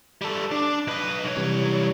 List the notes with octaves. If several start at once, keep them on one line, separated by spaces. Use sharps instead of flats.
G3 A4
D4
B1 B4 D#5
B1 C#5
C3 E3 G3